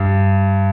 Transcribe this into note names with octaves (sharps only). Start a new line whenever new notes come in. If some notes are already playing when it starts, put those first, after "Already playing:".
Already playing: G2